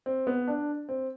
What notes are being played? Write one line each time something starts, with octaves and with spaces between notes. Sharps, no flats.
C4
B3
D4
C4